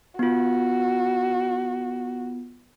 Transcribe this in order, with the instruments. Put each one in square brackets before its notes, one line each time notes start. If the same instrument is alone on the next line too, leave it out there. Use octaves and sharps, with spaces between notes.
[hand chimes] B3 F4 [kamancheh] F#4